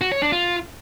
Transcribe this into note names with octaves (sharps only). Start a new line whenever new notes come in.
F#4
C#5
D4
F4